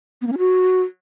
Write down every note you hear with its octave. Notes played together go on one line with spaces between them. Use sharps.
B3
A#3
C#4
F#4